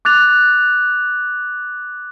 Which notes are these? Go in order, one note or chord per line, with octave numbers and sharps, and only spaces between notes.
D6 F#6 A6 F7